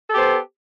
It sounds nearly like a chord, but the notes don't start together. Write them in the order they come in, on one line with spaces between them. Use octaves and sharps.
A4 G4 B3 C5